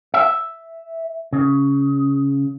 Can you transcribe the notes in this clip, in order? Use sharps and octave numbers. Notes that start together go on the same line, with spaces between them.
E5
C#3